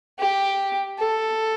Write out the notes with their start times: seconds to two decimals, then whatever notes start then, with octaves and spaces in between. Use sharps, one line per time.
0.19 G4
0.99 A4